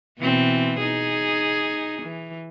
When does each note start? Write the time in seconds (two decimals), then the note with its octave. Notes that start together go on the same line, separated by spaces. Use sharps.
0.19 B2 E3 C4
0.80 D#4 G#4
2.02 E3